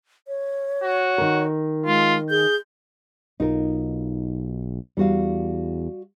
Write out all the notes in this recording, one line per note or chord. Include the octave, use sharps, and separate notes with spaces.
C#5
F#4
D#3 A#4
G#3 F4
G#4 G6
B1 D#4 F4 A#4
E2 G3 F#4 F5